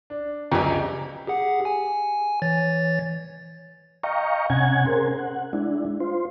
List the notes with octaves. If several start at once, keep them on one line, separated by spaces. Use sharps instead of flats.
D4
G1 C#2 F#2 F3 G4 G5 G#5 A#5
G4 G#4 F#5
G#5
E3 C#5 A6
D#5 F5 G5 A#5 C#6
C3 C#4 F#5 G#5 G#6
C#4 G#4 A#4 C5
F#5
G#3 D4 E4
F4 C5